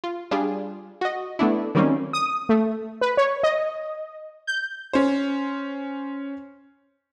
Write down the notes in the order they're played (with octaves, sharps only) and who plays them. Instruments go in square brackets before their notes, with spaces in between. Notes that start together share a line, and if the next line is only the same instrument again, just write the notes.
[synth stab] F4
G3 D4 F4 G#4
F#4 D#5
A3 B3 D4 E4
D#3 F#3 G3 A#3 C4 C#4
D#6
A3
B4
C#5
D#5
G6
[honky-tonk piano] C#4 C5